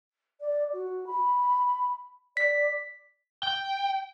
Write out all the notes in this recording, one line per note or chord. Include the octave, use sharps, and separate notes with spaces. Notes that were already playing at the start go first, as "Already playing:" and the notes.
D5
F#4
B5
D5 B6
G5